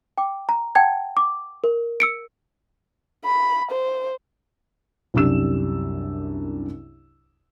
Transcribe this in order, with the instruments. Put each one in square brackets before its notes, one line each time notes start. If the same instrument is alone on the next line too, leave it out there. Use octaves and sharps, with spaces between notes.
[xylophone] G5 D6
A#5
F#5 G5 A5 G#6
D6
A#4
E6 C#7 D7
[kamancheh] B5
C5
[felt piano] C2 F#2 D4 G4 E6 E7